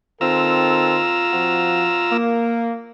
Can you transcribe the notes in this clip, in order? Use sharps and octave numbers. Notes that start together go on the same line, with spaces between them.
D#3 C4 F4 A4 A#5 E6
F3 C4 F#4
A#3